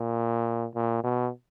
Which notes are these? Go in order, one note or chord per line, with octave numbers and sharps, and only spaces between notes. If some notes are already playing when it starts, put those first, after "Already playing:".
Already playing: A#2
A#2
B2